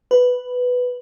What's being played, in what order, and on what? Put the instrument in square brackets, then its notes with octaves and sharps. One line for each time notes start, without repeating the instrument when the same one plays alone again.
[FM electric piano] B4